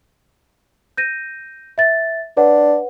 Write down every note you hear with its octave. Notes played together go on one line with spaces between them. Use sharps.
G6 A#6 D#7
E5 A6
D4 B4 C#5 F#5